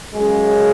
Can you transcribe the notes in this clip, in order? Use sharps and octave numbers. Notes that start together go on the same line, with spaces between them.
F#2 C#3 G#3